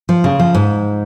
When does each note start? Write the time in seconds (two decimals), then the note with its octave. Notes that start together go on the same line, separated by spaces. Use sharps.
0.09 F3
0.24 C#3
0.40 F3
0.55 G#2